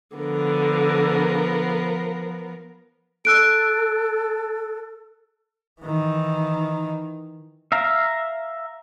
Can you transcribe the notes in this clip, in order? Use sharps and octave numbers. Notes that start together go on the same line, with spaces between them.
D3 F3 B3 A#4
A4 E6 F#6 D7
D#3 E3
E5 F5 A#5